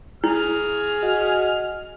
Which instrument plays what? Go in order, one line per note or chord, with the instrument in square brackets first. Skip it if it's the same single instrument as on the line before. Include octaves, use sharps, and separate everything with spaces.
[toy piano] E4 [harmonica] G#4 F6
[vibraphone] F#4 D#5 F#5